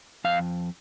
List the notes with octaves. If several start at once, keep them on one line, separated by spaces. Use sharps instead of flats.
F2 F5